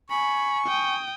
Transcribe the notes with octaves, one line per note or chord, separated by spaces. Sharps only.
G#5 B5 C#6
G5 D#6